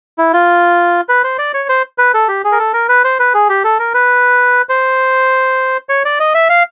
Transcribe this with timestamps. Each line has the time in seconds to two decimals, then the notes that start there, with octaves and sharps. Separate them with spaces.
0.18 E4
0.33 F4
1.09 B4
1.24 C5
1.38 D5
1.54 C#5
1.69 C5
1.98 B4
2.14 A4
2.28 G4
2.44 G#4
2.52 A#4
2.59 A4
2.73 A#4
2.89 B4
3.04 C5
3.20 B4
3.34 G#4
3.49 G4
3.64 A4
3.79 A#4
3.94 B4
4.69 C5
5.89 C#5
6.05 D5
6.20 D#5
6.34 E5
6.50 F5